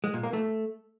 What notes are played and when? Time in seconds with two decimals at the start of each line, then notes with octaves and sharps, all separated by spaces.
0.04 G#3
0.14 A#2
0.23 A#3
0.33 A3